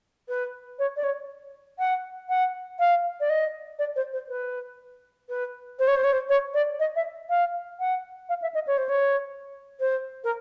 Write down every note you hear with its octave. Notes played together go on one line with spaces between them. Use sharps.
B4
C#5
D5
C#5
F#5
F#5
F5
D5
D#5
D5
C5
C5
B4
B4
C5
C#5
C5
C#5
C5
C#5
D5
D#5
E5
F5
F#5
F5
E5
D#5
C#5
C5
C#5
C5
A#4